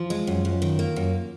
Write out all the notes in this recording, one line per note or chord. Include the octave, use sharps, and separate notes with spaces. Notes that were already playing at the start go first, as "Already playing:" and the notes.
Already playing: F3 F4
G#3
F#2
F#2
D#3
A#3
F#2